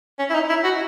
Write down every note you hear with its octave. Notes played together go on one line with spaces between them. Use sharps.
C#4
E4
D#4
E4
F#4